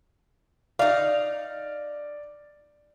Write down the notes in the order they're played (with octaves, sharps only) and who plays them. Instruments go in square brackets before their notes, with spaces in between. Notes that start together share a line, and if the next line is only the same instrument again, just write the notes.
[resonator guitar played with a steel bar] D#4 F5 [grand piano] D5